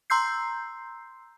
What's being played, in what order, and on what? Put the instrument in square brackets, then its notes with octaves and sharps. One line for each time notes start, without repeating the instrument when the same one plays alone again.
[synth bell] A#5 C6 E6 G6 C7